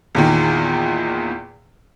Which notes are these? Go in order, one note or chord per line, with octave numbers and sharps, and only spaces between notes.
E2 A#2 D#3